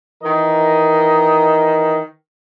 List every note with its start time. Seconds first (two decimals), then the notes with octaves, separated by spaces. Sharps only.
0.23 D#3 E3 A#4 D#5